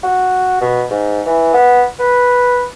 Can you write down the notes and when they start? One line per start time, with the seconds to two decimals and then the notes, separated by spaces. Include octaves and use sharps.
0.03 F#4
0.61 B2
0.90 G#2
1.26 E3
1.53 B3
1.99 B4